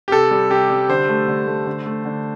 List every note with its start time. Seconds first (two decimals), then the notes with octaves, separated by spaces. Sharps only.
0.08 G4
0.11 C3 A4
0.31 G3
0.50 C3 G4
0.70 G3
0.89 D3 C5
1.09 A3
1.28 D3
1.47 A3
1.67 D3
1.86 A3
2.05 D3